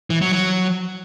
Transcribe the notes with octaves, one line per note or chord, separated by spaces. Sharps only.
E3
F#3
F#3